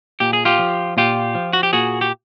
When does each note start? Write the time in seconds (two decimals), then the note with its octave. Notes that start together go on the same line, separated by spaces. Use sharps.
0.20 A#2 G4
0.33 G#4
0.45 F4 G4
0.58 F3
0.97 A#2 F4 G4
1.35 F3
1.53 F#4
1.63 G4
1.73 A#2 F#4 G#4
2.01 G4